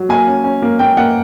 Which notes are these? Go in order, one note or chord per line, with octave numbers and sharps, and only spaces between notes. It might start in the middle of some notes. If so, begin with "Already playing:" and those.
Already playing: F#3
A#3 G#5
C#4
C#4
A#3
A#3 G5
A#3 F#5